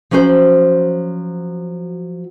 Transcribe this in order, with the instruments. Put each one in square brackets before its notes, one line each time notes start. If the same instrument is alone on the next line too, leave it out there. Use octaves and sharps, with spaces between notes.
[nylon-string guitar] F3 F#3 C#4 F#4 C5